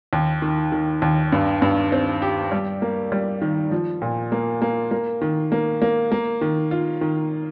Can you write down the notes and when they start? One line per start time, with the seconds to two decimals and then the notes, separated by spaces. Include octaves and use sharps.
0.13 D#2
0.42 D#3
0.72 D#3
1.02 D#2
1.32 G2
1.62 G2
1.92 C4
2.22 G4
2.52 G3
2.82 A#3
3.12 G3
3.42 D#3
3.72 F3
4.02 A#2
4.32 A#3
4.62 A#3
4.91 A#3
5.21 D#3
5.52 A#3
5.82 A#3
6.12 A#3
6.41 D#3
6.71 F4
7.01 D#3